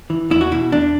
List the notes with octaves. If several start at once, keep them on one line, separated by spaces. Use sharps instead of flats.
E3
E2 E4
F#4
B2 E4
E2 D4